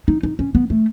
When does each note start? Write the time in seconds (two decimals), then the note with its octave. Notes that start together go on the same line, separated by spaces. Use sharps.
0.08 D#4
0.23 D#4
0.39 C#4
0.55 B3
0.70 A3